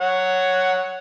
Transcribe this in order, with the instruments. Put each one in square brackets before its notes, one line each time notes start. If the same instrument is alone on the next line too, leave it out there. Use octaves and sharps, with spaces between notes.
[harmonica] C#5 F#5